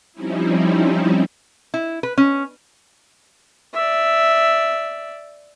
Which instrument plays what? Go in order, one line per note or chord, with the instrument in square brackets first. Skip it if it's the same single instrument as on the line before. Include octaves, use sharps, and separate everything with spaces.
[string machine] F3 G3 C4 C#4 D#4 E4
[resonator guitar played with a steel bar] E4
B4
C#4
[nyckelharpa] D5 E5